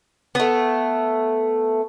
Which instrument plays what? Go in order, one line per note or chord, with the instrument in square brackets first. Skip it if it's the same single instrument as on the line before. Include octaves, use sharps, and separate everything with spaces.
[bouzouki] A3 B3